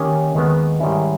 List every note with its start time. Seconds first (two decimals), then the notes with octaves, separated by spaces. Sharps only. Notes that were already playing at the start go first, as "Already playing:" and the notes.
Already playing: D#3 A#3 C#4 G4
0.34 D#2 D#3 G#3 B3
0.80 G#2 D#3 G3 C#4 E4